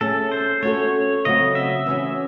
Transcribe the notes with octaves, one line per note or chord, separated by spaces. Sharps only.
A3 C#4 G#4 A4
C5
A3 C#4 F#4 A4 C#5
C#3 F#3 A3 C4 F#4 D#5
E5
E3 A3 C#4 F#4